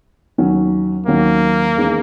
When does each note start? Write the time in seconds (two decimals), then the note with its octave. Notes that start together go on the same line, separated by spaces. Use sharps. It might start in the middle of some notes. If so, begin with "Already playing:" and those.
0.38 D#2 D#3 F#3 C#4
1.07 D#2 D#3 F#3 A#3 C#4
1.75 E2 D#3 G#3 C#4